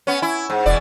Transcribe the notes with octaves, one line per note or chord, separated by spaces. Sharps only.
B3 C#4
E4
G#2
E1 B2 E3 D5